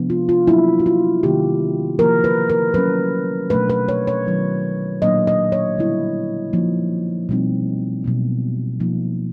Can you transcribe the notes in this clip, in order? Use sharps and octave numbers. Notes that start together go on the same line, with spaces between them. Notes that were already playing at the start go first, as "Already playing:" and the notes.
Already playing: C3 F3 G#3 B3 D4
F4
F4
F#3 A#3 D4 E4
F#4
F4
C3 D#3 G3 A#3 G4
D3 F3 A#3 A#4
B4
A#4
F#3 A3 C#4 B4
B2 F#3 A3 D4 B4
B4
C#5
C#5
D#3 F#3 B3 E4
A#2 F#3 A#3 D4 D#5
D#5
C#5
D3 G3 B3 E4
F3 A#3 D#4
B2 G3 C4 D#4
B2 F#3 A#3
F3 A#3 D#4